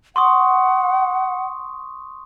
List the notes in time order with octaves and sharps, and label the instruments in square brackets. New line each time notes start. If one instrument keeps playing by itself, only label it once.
[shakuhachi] F#5 [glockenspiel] C6 C#6 D#6